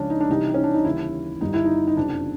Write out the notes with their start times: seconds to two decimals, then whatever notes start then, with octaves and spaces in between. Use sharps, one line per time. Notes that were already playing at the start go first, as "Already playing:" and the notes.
Already playing: C#2 C#3 F3 C#4 D4
0.10 D#4
0.20 D4
0.29 C2 C3 E3 G3 D#4
0.54 C#4
0.64 D4
0.74 D#4
0.85 D#2 C#3 E3 G3 E4
1.40 G1 G2 D#3 G3 D#4
1.54 E4
1.65 D#4
1.87 D#4
1.96 F#1 F2 C3 D4